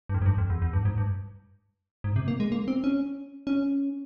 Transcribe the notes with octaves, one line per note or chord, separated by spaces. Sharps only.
G2
F2
G#2
G2
F2
E2
E2
G2
G#2
G2
G#2
C3
A#3
G#3
A#3
C4
C#4
C#4